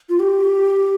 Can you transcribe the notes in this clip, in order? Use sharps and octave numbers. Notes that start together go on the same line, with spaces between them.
F4
G4